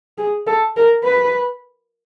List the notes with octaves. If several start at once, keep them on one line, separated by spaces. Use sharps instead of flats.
G#4
A4
A#4
B4